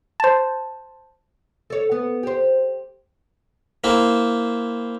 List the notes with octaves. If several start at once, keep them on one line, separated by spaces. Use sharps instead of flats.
C5 A5
A4 C#5
B3
G4 C5
A#3 C4 E4